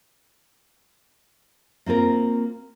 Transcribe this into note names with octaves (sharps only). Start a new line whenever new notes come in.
A#3 C4 F4 A#4